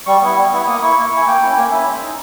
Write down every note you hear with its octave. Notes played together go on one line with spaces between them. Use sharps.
G3 C#6
B3 E4
G3
B3 E4
A#3 D#6
E4 C#6
A#3
E4
G#5
A#3 G5
C#4 E4
A#3 G#5
C#4 E4 E5
G#3
D#4